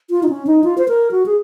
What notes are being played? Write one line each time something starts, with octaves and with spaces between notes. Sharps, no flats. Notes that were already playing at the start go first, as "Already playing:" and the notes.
F4
D#4
C#4
D#4
F4
C5
A#4
F#4
G#4